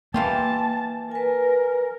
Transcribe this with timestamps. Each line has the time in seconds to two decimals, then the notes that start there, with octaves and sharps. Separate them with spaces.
0.14 E3 A#3 F4 G4 A5
1.11 A#4 B4 G#5